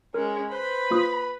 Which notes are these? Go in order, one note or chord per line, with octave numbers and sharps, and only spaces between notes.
G#3 C#4 A#4
B4 C5 B5
A#3 F4 D#6